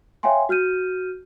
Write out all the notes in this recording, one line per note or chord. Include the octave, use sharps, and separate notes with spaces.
C#5 E5 F5 G5 G#5 C6
F#4 F6 G6 D#7